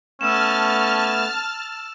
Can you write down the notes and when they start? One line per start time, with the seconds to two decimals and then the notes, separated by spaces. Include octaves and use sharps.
0.21 A3 B3 C#4 A5 E6 F6 E7